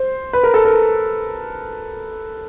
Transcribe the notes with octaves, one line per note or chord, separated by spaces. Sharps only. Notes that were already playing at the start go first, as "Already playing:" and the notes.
Already playing: C5
B4
A#4
A4
A#4